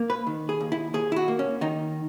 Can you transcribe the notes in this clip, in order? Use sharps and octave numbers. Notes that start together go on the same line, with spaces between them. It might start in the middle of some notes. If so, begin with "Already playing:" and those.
Already playing: A#3
B4
D#3
G#4
D#2
E4
D#2 G#4
E4
F#4
A#3
C#4
D#3 D#4